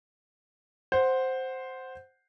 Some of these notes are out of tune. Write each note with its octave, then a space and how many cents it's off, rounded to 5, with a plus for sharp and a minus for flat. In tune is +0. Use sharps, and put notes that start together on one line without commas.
C5 +0 F#5 +0